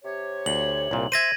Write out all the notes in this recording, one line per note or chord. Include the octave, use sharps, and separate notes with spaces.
C3 G4 C#5
D2 F#7
C2 A#2
C5 E5 G#6 A#6 D#7